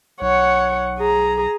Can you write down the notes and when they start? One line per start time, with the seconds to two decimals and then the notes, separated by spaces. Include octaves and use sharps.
0.21 B1 C#5 F#5
0.99 G#4 A#5